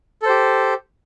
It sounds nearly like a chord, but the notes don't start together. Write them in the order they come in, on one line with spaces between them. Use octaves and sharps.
A4 C5 G4